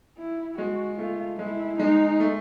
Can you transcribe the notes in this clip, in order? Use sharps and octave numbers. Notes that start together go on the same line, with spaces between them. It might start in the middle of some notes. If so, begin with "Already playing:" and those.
E4
G#3 F#4
A3 F4
G#3 E4
G#3 D#4
A3